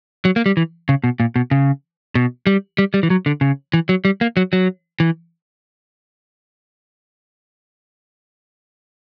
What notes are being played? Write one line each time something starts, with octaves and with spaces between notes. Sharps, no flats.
F#3
A#3
G3
E3
C#3
B2
A#2
B2
C#3
B2
G3
G3
G3
E3
F#3
D3
C#3
E3
F#3
G3
A#3
F#3
F#3
E3